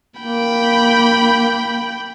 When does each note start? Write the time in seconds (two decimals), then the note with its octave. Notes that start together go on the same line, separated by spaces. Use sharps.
0.20 A#3 G5 B5